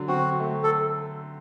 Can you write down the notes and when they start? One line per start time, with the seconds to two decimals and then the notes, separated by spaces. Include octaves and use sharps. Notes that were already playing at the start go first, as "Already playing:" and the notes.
Already playing: D3 F#3
0.08 C4 F#4
0.40 A3
0.63 A4